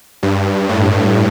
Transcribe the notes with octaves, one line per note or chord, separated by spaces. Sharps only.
G2
A2